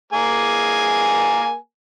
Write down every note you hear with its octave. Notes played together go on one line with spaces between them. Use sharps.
A#3 G#4 G#5